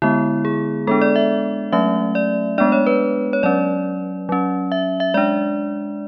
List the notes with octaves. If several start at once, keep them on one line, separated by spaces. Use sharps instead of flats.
D3 G#3 B3 E4
G#4
G#3 B3 D4 A4
D5
E5
F#3 A3 C#4 E5
D5
G#3 B3 D4 D5
C#5
B4
C#5
F#3 C#4 D5
F#3 C#4
E5
E5
G#3 D4 D5